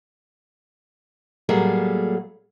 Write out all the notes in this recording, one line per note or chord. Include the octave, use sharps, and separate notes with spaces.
A2 F#3 G3 A#3 G#4 A4